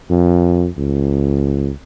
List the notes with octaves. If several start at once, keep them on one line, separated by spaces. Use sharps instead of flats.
F2
C#2